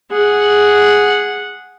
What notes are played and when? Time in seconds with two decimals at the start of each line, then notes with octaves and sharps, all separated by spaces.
0.11 G#4 F#5